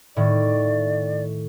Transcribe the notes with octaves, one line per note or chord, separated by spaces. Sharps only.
A2 D#3 D5